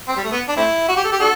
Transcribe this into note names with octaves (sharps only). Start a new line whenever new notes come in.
C4
G3
A3
B3
D4
A3 C4 E4
F#4
G4
A4
G4
D4 F#4 A4